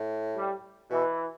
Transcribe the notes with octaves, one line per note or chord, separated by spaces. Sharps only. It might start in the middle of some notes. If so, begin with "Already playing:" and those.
Already playing: A2
G3
B2 E3